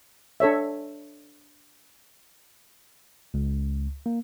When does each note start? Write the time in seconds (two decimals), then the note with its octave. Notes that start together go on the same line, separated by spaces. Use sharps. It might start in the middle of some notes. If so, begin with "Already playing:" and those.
0.40 D4 A4 C#5 E5
3.34 C#2
4.06 A#3